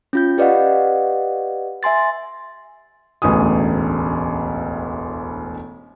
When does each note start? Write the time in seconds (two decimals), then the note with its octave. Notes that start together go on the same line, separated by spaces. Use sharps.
0.13 C#4 F4 G6
0.38 G4 B4 D5 D#5 F5 F#5
1.83 E5 G#5 C6 A6
3.22 E1 A1 D2 G#5 D#6